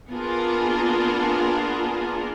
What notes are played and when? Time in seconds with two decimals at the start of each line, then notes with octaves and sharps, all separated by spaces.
0.11 A#3 B3 D4 F4 G#4 A#4